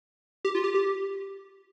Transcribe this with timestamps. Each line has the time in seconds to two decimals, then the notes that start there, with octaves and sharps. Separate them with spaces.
0.45 G4
0.55 F4
0.64 G4
0.74 G4